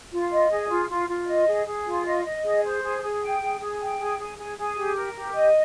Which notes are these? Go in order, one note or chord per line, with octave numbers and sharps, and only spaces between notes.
F4
D#5
G#4
F4
F4
F4
D#5
G#4
G#4
F4
D#5
D#5
G#4
C5
G#4
G#4
G5
G#4
G#4
G5
G#4
G#4
G#4
G#4
G4
A#4
G4
D#5